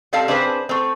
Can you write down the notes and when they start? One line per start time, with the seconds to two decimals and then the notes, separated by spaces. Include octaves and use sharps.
0.13 G3 C4 A4 F5 A5
0.28 C4 D4 G#4 B4 C5
0.69 A3 C4